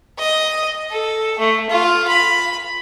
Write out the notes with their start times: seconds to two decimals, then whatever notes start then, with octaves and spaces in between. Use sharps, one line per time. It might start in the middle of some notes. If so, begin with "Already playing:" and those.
0.19 D#5
0.91 A4
1.39 A3
1.70 F4
2.08 B5